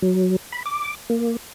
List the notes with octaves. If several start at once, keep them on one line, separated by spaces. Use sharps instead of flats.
F#3
B5
D6
A#3